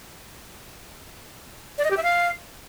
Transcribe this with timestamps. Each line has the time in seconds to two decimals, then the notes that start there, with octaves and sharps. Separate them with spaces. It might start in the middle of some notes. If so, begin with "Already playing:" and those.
1.78 D5
1.84 D#5
1.91 G4
1.97 E5
2.03 F5